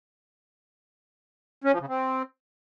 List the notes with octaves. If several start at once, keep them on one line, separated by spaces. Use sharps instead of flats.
C#4
F3
C#3
C4